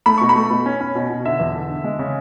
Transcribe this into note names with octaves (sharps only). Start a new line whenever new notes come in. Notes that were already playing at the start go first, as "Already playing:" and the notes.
A3 B5
B2 C#6
B5
A3
B2
C#4
C#4
B2
B2
D3 E5
E2
D3
D3
G#3
C#3